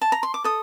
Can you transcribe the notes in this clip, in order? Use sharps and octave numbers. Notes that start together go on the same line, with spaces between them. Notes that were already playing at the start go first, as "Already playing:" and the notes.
A5
A#5
C6
D6
A4 D#6